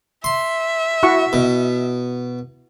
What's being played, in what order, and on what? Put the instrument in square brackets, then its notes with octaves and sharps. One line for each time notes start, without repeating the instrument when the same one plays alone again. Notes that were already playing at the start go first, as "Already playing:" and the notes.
[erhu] E5 [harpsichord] C6
[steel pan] E4 F#4 C#6
[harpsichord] B2